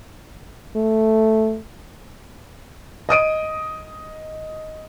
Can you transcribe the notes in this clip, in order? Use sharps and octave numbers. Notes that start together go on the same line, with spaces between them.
A3
D#5 D#6 D7 D#7